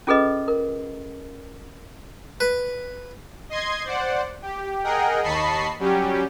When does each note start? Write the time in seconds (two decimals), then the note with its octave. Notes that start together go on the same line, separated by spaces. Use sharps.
0.07 C#4 F4 G#4 A4 B4 D#5
0.48 A#4
2.40 B4
3.49 D#5 C6 G#6
3.84 C5 D5 F#5
4.42 G4
4.84 G#4 A#4 D#5 F#5 G5
5.23 D#2 D#5 A5 B5 C#6 C7
5.79 F#3 G3 C#4 G4